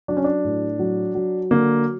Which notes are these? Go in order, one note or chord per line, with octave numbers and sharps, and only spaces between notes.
F#3 D4
C#4
D4
A2
F#3
F#3
D3 A#3